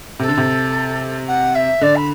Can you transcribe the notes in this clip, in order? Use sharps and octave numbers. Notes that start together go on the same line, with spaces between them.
C3 A4
D3
C3
F#5
E5
D3 D5
B5